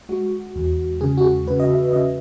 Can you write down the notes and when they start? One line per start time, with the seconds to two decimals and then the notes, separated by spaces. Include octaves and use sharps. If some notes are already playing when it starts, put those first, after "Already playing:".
0.09 G#3 F#4
0.55 E2
1.01 C#3 G#4
1.17 F#4
1.24 G#4
1.47 C#3 B4
1.60 D#5
1.71 E5
1.93 C#3 D#5